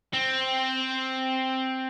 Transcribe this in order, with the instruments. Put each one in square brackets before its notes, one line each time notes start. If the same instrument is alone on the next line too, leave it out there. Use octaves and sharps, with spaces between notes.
[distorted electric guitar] C4